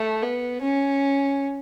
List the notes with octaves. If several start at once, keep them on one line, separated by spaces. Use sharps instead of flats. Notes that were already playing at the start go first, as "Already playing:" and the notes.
Already playing: A3
B3
C#4